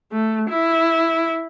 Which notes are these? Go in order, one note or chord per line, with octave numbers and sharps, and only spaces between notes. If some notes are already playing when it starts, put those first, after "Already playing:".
A3
E4